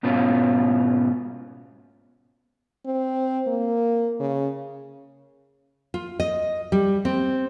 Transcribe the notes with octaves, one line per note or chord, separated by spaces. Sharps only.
G#2 B2 C#4 F4 F#4
C4
A#3
C#3
F4
D#5
G3
C4